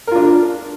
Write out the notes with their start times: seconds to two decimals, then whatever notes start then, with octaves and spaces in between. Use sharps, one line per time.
0.07 A#4
0.11 F4
0.16 D4